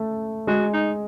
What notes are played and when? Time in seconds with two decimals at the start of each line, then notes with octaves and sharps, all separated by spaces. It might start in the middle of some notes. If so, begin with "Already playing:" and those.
Already playing: A3
0.47 G#3 F#4
0.74 D#4